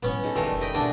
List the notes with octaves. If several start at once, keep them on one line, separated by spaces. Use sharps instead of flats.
A2 F#3 B3 C#4
D#4 G#4 A4
A#2 D3 E3 G3 A3 D4
F1 F3 G5
D#5 G5 B5
A#1 B2 D3 A3 D4 G#4